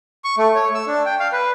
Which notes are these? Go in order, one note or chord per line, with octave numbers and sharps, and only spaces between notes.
C#6
A3
C#5
E6
D4
G5
F5
B4